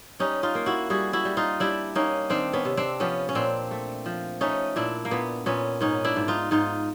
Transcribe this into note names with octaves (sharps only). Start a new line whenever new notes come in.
G3 C#4 D#4
D#4 F4
A#3
E4 F#4
G3 F#4 G#4
E4 F#4
G3
D#4 F4
G3 D4 E4
A#3 C#4 D#4
D#3 C4 D4
B3 C#4
C3
C4 D4
F3 B3 C#4
C#4
A#2 C4 D4
A3
F3
A3 C#4 D#4
A#2 D4 E4
A#3
A#2 B3
A#2 B3 C#4
G#2 C#4 D#4
D4 E4
G#2
D#4 F4
G#2 D#4 F4